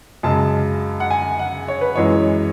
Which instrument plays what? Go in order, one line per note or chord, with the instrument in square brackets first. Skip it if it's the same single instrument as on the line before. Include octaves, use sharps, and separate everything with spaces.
[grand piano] F#2 C#3 G#3 A5
F#5
G#5
F#5
C#5
B4
F#2 E3 G#3 C#5